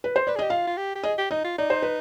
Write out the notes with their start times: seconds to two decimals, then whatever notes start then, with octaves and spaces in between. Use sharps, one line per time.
0.04 B4
0.16 C5
0.27 B4 D5
0.35 G#4
0.39 G4 D#5
0.50 F4 F5
0.67 F4
0.77 G4
0.95 G4
1.03 G#4 D#5
1.18 G4
1.31 D#4 D#5
1.44 F4
1.58 D#4 D5
1.70 C5
1.82 B4